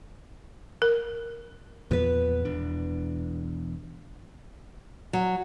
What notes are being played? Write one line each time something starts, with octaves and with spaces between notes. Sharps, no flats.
A#4
E2 A#2 F3 B3 B4
E1 E2 D4
F#3